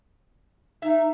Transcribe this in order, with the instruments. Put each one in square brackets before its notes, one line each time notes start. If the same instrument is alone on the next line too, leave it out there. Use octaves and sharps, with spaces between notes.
[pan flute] D#4 [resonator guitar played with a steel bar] E5